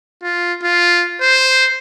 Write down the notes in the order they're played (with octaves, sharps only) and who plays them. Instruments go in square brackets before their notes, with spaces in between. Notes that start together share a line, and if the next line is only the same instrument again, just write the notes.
[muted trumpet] F4
F4
C5